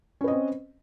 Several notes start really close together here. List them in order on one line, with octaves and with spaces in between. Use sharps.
C#4 B4 D#5 C4